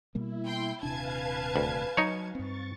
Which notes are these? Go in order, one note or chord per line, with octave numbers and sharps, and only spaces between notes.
B2 G3 A#3 E4
G5 C6 G6
D#1 C3 D4 B4 F5 G#5 A5 G#6
D2
F#3 D#4 C#5
G2 C4 C#6 A6